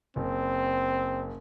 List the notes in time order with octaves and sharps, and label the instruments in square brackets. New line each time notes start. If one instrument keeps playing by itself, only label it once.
[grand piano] F#1 [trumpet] C4